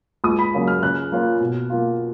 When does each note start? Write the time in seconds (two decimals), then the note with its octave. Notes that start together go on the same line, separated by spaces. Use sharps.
0.24 C#2 D#6
0.39 B5
0.54 C#3 F#3 A#3
0.67 F6
0.83 C#3 F#6
1.12 F3 A#3 C#4 F4
1.41 B2
1.70 A#3 F4